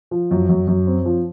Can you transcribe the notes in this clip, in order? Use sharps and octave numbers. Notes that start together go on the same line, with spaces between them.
F3
F#2
F#2
F#2
C4
F3